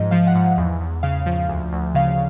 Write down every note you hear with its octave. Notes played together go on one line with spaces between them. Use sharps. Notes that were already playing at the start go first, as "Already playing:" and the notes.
Already playing: G#2 F3 D#5
F3 F5
F#5
G#2
E2
E2
C#3 F5
F3
D2
D2
C#3 F5